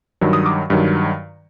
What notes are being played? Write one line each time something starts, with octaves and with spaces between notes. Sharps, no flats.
G2 D#3 F#3
D#6
D6
G2 D#3 F#3